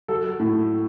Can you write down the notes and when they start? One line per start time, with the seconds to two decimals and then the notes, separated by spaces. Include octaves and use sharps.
0.08 F#3 A4
0.40 A2